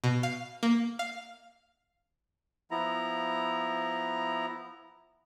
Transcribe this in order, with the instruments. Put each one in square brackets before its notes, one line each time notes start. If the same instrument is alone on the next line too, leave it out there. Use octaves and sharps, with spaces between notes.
[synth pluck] B2
F5
A#3
F5
[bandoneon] F3 B3 E4 A#5